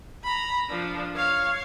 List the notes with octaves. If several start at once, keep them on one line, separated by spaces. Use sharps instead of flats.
A#5 B5
F3 D4
C#5 F5